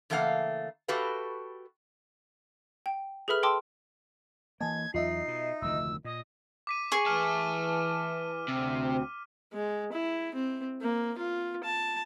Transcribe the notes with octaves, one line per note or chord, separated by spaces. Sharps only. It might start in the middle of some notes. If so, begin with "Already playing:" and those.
C#3 E3 A3 A#3 F5 F#5
F#4 G4 A4 B4 F5
G5
G#4 A4 B4 E5 B5 F6
G5 A5 C6 D6 E6
E3 A#3 D#5 G#5 A5 G#6
E2 F#3 D#4 F4 D#5 E5 C7
B2
F1 D2 D#3 E6
A#2 D#5
D6 B6 D#7
G#4 C#6
E3 E5 A5 F6 D#7
D2 C3 C4
G#3
E4
C4
A#3
F4
A5